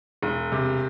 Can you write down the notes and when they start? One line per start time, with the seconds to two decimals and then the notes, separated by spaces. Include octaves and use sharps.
0.23 E1
0.52 C3